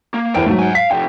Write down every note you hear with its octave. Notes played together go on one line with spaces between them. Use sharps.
A#3
E2 A#4 C5 G5 D7
G#2 F#3 A3
F#5 G#5
F5 B6
C3 F3 G5